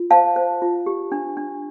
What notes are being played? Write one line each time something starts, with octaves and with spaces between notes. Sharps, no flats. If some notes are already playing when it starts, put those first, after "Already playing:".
Already playing: F4
C5 F5 A5
C5
F4
G4
D4
D4